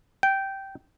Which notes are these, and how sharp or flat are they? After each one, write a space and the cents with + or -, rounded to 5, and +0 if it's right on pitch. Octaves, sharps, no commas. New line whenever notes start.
G5 -10